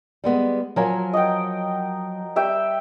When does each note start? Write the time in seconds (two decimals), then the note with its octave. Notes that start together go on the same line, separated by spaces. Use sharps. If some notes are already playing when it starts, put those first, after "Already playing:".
0.24 G3 G#3 B3
0.76 F3 F#3 A#4 C#5 G#5
1.13 D#5 F#5 G5
2.36 G3 E5 G5